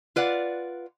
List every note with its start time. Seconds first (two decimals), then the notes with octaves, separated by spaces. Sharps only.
0.16 F4 B4 D5 F#5